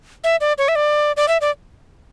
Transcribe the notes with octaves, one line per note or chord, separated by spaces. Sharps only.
E5
D5
C#5
E5
D5
D5
E5
D5